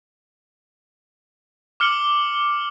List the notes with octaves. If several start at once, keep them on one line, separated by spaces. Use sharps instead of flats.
D6 F6 C#7 F#7 G7